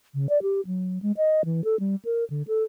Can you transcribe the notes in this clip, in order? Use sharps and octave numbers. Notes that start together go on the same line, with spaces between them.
C#3
D5
G4
F#3
G#3
D#5
E3
A4
G3
A#4
D3
A4